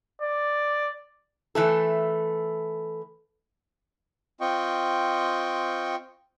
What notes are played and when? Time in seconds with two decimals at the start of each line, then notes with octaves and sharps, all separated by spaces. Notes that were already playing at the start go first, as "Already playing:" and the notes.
0.22 D5
1.55 E3 A3 A4
4.41 C4 F4 D#5 G5 C#6